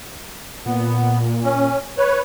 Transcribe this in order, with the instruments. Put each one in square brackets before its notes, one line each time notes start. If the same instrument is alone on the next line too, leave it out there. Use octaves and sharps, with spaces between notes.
[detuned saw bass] A#2 [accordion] B3
[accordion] C#4
B4 C#5